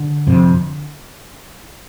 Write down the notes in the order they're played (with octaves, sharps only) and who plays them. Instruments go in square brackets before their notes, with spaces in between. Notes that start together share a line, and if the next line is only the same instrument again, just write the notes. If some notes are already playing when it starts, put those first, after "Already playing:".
Already playing: [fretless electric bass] D3
F2 C3